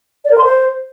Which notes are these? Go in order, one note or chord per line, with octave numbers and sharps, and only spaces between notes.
D5
A#4
C6
C5